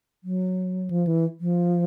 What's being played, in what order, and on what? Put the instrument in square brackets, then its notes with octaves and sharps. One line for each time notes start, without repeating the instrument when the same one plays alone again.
[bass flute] F#3
F3
E3
F3